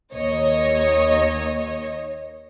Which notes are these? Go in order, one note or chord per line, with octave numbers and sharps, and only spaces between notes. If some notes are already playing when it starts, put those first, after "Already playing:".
D#2 C#5 D#5